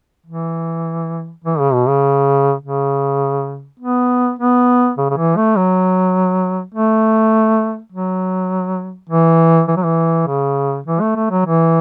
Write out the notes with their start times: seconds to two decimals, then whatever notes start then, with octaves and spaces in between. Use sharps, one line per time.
0.26 E3
1.44 E3
1.59 C#3
1.73 B2
1.88 C#3
2.61 C#3
3.79 B3
4.39 B3
4.97 C#3
5.10 C#3
5.17 E3
5.36 A3
5.56 F#3
6.74 A3
7.92 F#3
9.09 E3
9.68 E3
9.76 F#3
9.84 E3
10.27 C#3
10.87 E3
11.01 A3
11.16 A3
11.30 F#3
11.45 E3